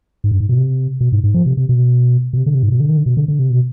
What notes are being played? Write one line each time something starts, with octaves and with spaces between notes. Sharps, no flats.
G#2
G2
G#2
B2
C3
B2
G#2
G#2
F3
C3
C3
B2
B2
C3
D3
C3
G#2
B2
D3
D#3
D3
B2
D3
D3
C3
B2